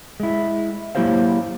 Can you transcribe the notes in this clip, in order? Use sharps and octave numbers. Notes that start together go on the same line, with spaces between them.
G#3 E4
F#3 A#3 E4 G4 C5 F5